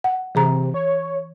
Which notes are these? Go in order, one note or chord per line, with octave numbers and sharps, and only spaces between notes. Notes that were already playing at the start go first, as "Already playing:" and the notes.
F#5
C3 E3 G#4 A#5
C#5